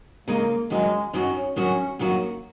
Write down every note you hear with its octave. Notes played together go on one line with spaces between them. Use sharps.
C#3 G#3 A#3 D#4
F#2 D#3 F#3 G#3 D#4 F#4
F#2 D#3 F#3 C#4 D#4 F#4
F#2 D#3 F#3 C#4 D#4 F#4
F#2 D#3 F#3 A#3 D#4 F#4